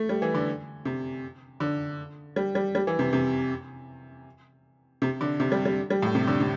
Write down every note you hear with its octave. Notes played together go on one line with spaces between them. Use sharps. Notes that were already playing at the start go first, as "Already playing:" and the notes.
Already playing: A3
G3
E3
D3
C3
D3
G3
G3
G3
E3
C3
C3
C3
D3
C3
G3
G3
G3
A2
C3
D3
C3